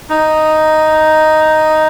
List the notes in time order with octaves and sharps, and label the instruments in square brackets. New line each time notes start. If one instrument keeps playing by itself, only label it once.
[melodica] D#4